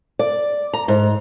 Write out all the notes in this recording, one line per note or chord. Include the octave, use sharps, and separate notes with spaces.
D5
A#5
G#2